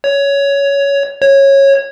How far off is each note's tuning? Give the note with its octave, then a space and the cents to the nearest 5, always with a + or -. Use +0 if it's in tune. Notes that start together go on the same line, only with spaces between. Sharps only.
C#5 +15
C#5 -15